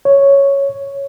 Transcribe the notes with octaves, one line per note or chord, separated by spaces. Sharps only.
C#5